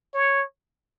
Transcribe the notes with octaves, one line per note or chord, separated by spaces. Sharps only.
C#5